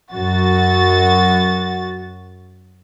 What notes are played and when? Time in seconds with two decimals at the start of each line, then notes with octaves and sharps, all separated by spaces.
0.13 F#2 F#4 A6